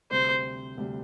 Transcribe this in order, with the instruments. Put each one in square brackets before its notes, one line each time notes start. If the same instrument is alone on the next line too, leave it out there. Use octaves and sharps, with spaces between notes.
[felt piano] D2 C3 G3 [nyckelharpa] C5
[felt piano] D2 C3 G3